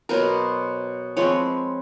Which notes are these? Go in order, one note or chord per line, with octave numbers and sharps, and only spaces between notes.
B2 F#3 B3 A#4 C5
F3 G#3 C4 B4 C#5